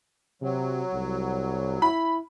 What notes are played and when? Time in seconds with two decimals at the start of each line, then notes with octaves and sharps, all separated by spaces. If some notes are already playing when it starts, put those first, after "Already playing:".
0.42 C3 F#3
0.93 C2
1.82 E4 B5